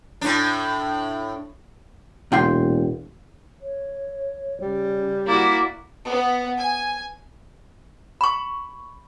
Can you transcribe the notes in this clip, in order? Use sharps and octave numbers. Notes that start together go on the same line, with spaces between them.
A2 D4
E1 A#2 G5 C6
C#5
C#3 G3
A#3 E4 F#4 D5
B3
G#5
B5 C#6